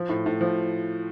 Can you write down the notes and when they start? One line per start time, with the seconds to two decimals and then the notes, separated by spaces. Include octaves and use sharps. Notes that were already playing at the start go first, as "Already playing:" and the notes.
Already playing: F3
0.09 A2
0.26 A2
0.41 F3